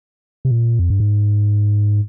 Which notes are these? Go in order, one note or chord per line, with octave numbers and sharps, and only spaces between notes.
C3
A#2
F2
G2
G#2